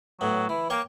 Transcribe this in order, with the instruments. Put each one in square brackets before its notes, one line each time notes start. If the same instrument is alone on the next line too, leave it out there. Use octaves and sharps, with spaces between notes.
[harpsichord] A2 B3 [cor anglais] F#3
[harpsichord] E3 [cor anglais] E4
[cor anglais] A#3 [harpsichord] C#5 G5 C#6